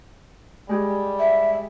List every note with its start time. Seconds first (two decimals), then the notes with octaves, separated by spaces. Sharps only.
0.69 G3 G#3 G4 G#4
1.19 E5